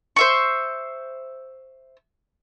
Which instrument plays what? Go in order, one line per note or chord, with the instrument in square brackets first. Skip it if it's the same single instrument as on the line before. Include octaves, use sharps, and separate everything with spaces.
[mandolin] C5 E5 C#6